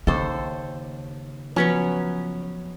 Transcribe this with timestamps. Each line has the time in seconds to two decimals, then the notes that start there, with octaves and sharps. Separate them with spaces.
0.07 D#2 C#3 A4 C5
1.56 F3 F#3 B3 C#4 C#5